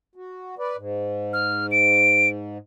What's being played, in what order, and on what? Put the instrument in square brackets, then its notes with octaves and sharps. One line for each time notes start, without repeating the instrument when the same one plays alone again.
[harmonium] F#4
B4 D5
G#2
[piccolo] F6
D7